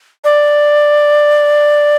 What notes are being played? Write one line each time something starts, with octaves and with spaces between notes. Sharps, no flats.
D5